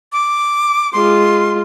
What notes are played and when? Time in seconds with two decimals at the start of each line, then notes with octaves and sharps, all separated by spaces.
0.12 D6
0.93 G#3 F4 C6